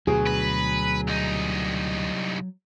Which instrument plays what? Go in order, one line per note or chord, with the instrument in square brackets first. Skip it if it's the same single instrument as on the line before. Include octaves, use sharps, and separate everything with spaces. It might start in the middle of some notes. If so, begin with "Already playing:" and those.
[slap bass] D2 B2 [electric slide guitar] F#3 [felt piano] G#4
[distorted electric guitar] B4
C2 D#4